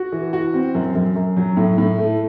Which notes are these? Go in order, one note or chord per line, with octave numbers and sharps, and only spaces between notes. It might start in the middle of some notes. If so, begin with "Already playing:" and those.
Already playing: F#4
E3
F#4
C4
F#2
F#2
F#2
F#3
A2
A2
A3